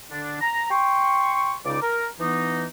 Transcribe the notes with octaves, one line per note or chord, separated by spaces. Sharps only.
D3 D4
A#5
G5 C6 C#6
C#2 C#3 D#4 D5 D6
A#4
E3 B3 D#4